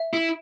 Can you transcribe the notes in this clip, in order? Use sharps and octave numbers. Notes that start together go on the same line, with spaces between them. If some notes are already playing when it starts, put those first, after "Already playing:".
Already playing: E5
E4